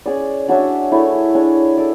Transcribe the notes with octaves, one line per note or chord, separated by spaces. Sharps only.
C#4 G#4 D5
D4 F#4 C#5 E5
A3 E4 G#4 C#5
D4 G#4 C#5
A4 D5